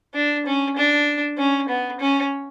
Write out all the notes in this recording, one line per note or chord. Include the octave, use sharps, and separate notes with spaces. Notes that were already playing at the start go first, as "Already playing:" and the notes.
D4
C#4
D4
C#4
B3
C#4